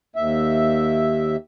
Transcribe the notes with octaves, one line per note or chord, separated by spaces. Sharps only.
D#2 E5